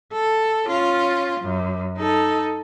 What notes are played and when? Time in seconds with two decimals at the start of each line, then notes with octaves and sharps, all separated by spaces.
0.13 A4
0.67 C#4 F4
1.40 F#2
1.98 D#4 A4